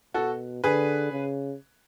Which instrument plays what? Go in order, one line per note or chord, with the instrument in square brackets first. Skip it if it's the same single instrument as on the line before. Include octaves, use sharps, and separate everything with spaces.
[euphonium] B2 [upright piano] F#4 A4
[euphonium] D3 [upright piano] G#4 B4
[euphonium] C#3